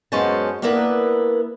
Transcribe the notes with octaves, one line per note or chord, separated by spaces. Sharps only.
F#2 G#3 B3 C#4 C5 A5
A#3 B3 D4 E4 A#4 B4